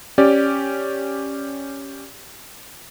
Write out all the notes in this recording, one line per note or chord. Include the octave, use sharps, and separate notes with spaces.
C#4 G4 D5